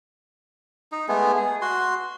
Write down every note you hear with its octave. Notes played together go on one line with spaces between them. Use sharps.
D#4
G#3 A3 B3
G#4
F#4 C6